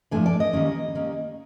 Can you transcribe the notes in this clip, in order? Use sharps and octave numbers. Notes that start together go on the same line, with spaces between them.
A2 F3 A3 D4 G#5
D5
D#5
D#3 G3 A#3 C#4
D#3 G3 A#3 C#4